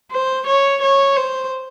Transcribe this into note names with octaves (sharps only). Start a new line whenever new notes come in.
C5
C#5
C#5
C5